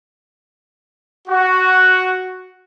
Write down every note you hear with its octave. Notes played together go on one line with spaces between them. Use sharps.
F#4